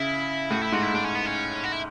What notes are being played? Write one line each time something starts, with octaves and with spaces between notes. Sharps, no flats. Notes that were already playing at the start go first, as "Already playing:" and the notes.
Already playing: C#3 E4
A2 F#4
E4
G#2 F#4
E4
A2 D4
C#4
B3
C#4
F#4
E4